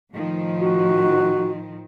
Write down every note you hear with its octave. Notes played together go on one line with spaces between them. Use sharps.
A2 D#3 F3
F#4